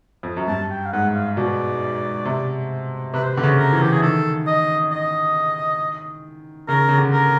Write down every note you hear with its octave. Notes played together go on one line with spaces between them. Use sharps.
F2
F#2
G2 A5
G5
F5
G#2 F#5
F5
B2 D5
C3
C3 B4
C5
D3 B4
C#3
A#4
E3
G4
G#4
D#3 A4
D#5
D#5
C#3 A#4
C#3
D3
A#4